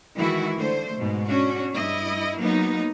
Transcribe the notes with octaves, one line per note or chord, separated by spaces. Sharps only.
D#3 E3 G#3 E4 F#4
D3 A3 C5
G#2 B2
C#4 D4 F#4
G2 E4 D#5
F#3 A#3 B3 D#4